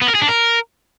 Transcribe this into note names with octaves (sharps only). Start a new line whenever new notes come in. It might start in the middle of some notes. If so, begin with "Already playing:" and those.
B3
A#4
G#4
D4
A#4